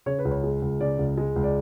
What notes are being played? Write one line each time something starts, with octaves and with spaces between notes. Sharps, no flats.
C#3 C#5
B4
C#2
C#5
G#3
C#2
C#3 D5
C#2
G#3
C#2
D5